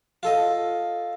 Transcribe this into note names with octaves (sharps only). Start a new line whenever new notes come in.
F4 A4 D#5